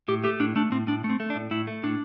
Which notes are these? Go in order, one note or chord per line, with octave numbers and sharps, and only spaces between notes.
A2 G4
A3 G4
A2 D4
A3 D4
A2 C4
A2 D4
A3
C4
A3
D4
A2
A2 E4
A3
A2 D4